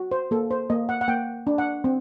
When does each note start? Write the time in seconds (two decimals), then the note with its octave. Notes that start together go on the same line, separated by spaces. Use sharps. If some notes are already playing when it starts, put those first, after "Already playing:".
Already playing: F#4
0.12 C5
0.31 A#3 A4
0.51 C5
0.70 A#3 D#5
0.89 F#5
1.01 F#5
1.08 A#3 G5
1.47 D4
1.58 F#5
1.84 C4